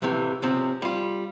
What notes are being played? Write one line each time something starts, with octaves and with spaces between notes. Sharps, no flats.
F2 A2 C3 E3
C#2 G#2 C3 F3 C4
G3 F4